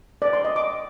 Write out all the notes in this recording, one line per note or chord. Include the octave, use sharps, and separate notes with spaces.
D5
C6
D#5
D6